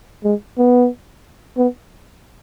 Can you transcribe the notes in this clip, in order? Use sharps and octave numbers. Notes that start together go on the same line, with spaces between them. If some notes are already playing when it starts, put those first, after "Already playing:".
G#3
B3
B3